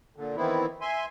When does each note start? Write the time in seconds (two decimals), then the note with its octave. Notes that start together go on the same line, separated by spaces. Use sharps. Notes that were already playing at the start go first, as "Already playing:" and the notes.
0.16 A#2 D3
0.37 D#3 E3 B3 C4 E4
0.81 E5 G#5 C6